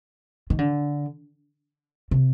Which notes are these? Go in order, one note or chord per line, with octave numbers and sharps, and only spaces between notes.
D#3
D3
C3